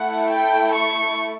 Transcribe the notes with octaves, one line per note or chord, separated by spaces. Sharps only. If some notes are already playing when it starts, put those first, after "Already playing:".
Already playing: A3 E4 A4 F#5
G5
C#6